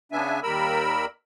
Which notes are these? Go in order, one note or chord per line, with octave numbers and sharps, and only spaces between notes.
C#3 B3 D4 E5 G#5
D#2 G3 A#4 B5 E6